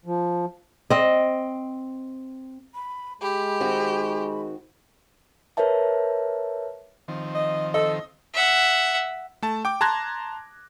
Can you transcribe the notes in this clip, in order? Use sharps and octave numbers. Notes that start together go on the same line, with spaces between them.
F3
C4 D#5
B5
G#3 G4 B5
D#3 C4 F#4
A#4 B4 C#5 E5 A5
D#3 F3 C4
D#5
A4 D#5
E5 F#5
A3 A5
G5 D6
A5 A#5 C6 F#6 G#6 A#6